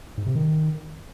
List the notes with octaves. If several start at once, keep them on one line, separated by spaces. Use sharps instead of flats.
G#2
C3
D#3